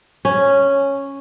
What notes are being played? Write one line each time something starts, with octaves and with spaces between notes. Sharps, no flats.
C#4